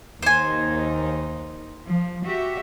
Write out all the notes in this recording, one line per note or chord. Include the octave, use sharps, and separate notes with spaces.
D#2 D#4 C5 G#5
F3
F#4 G4 E5